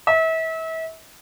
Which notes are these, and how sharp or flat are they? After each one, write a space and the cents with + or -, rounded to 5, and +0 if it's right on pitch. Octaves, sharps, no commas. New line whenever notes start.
E5 -35